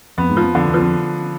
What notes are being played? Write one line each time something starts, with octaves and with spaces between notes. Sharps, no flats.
F2 B3
G#2
F3
F2
F2 D3
E2
F3
F2